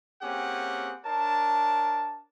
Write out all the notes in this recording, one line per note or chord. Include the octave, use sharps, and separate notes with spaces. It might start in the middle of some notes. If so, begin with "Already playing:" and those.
A#3 C4 C#4 G4 G#4 F#5
D4 A#4 C#5 A5